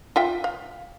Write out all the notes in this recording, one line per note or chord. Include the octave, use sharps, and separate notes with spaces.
F4 E5 G5
F5